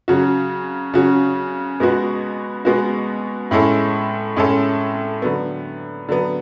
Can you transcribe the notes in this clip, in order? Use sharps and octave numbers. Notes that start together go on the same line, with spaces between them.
C#3 F#3 C#4 F#4
C#3 F#3 C#4 F#4
B2 G#3 B3 F#4
B2 G#3 B3 F#4
A2 G#3 C#4 E4 A4
A2 G#3 C#4 E4 A4
D3 F#3 B3
D3 F#3 B3